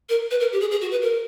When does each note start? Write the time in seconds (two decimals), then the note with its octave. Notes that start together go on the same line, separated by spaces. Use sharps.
0.09 A#4
0.31 B4
0.40 A#4
0.52 G4
0.60 G#4
0.71 G#4
0.81 F#4
0.91 B4
1.02 A#4